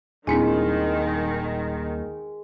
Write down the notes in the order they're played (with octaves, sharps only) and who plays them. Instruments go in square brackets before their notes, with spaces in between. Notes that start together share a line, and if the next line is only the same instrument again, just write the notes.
[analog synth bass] D#1 [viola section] D#3 [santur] G#3 [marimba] C4 D4 E4